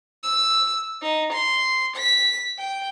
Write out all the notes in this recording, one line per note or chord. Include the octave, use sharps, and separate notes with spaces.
E6
D#4
C6
B6
G5